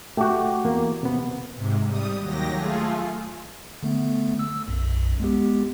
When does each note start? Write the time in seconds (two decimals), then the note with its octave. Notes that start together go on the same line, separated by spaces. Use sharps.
0.17 A3 F#4 G4
0.65 E2 A#3
1.03 C3 B3
1.54 G#2 C3
1.84 G3 D#6
2.18 D#2 F#3 G4 A#6
2.52 A3 F4 G#4
3.83 D3 A3 B3
4.39 E6
4.68 B1 F#2
5.20 G#3 B3 G4